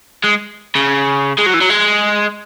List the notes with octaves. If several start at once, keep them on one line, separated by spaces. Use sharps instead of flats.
G#3
C#3
G#3
F#3
E3
F#3
G#3